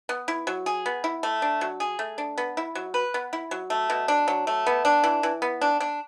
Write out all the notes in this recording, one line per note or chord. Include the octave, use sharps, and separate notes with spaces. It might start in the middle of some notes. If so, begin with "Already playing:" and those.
B3
E4
F#3
G#4
B3
E4
A3
D4
F#3
G#4
A3
D4
B3
E4
F#3
B4
B3
E4
F#3
A3
B2
D4
F#3
A3
B3
D4
E3
E3
B3
D4
D4